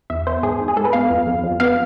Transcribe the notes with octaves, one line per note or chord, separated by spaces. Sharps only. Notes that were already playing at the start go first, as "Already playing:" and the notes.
E2 E5
B3 C5
G#2 G#4
G#2
G#4
G#2 A4
B4
B3 F5
F2
F2
F2
B3 F5